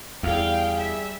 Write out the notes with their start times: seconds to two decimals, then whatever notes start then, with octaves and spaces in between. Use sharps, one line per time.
0.23 E2 G3 G#4 F5 G5
0.79 E5